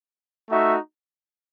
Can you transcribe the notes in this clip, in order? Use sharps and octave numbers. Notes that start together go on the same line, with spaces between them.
A3 D#4 F#4 E5